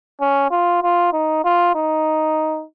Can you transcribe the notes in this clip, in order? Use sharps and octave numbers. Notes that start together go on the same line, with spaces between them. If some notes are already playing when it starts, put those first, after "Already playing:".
C#4
F4
F4
D#4
F4
D#4